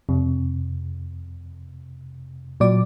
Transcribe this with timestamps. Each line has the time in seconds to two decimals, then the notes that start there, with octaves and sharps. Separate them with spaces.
0.09 F2 C3
2.60 A#2 F#3 D5 D6